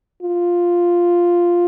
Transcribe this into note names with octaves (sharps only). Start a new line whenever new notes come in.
F4